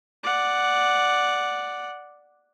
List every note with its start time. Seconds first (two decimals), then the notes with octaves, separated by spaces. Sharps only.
0.23 D5 F#5